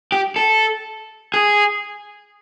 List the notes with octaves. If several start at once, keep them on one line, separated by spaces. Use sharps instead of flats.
G4
A4
G#4